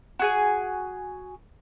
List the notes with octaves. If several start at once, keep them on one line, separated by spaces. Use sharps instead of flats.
F#4 G#4 G#5